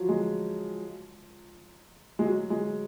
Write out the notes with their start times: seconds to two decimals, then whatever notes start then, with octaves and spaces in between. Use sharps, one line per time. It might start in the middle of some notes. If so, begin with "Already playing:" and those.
Already playing: F3 F#3
0.09 G#3
2.19 G#3
2.26 F#3
2.50 G#3